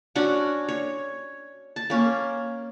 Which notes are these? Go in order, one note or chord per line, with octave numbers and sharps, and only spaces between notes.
C#4 D4 F#4 C#5
C#5
A5
A#3 C#4